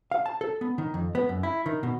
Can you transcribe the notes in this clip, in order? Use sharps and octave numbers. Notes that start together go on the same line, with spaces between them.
F5
A5
A4
B3
D#3
F2
B3
F#2
E4
D#3
B2